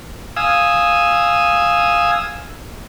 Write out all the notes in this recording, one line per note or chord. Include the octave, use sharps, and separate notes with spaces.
F5 G#5 D#6 E6